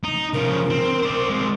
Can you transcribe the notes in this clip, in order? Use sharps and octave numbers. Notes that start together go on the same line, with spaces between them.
D#4
C#3 F3 A#4
C4
C5 D5
G#3 C4